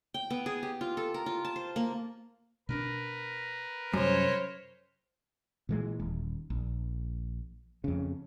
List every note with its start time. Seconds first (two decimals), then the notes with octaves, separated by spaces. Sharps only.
0.14 G5
0.30 B3
0.46 G#4
0.63 G4
0.81 F4
0.97 A4
1.14 A#4
1.26 F4
1.45 A5
1.56 C5
1.76 A#3
2.69 B2 C4 D4 A#4 B4
3.93 F#2 C3 G3 C5 C#5
5.69 A#2 E3 G#3
6.00 D#1
6.50 A#1
7.84 F2 C#3